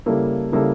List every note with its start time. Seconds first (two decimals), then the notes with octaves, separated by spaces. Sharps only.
0.06 C#3 G3 A#3 E4 A4
0.52 C#3 G3 A#3 E4 A4